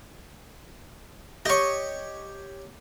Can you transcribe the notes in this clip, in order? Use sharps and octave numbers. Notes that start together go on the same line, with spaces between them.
G4 C#5 D#5 C#6